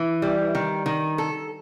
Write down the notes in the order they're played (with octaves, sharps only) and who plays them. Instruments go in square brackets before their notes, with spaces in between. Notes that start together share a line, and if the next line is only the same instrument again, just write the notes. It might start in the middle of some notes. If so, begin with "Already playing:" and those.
Already playing: [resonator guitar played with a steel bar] E3
G3
D#3
D#3
A4